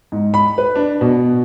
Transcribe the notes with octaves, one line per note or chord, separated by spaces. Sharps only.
G#2
B5
B4
D4
B2